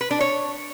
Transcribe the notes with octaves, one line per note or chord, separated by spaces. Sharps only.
B4
D4
C#5